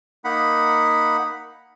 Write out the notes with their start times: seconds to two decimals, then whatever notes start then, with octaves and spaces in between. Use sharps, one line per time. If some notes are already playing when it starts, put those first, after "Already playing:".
0.25 A#3 D#4 F#5 B5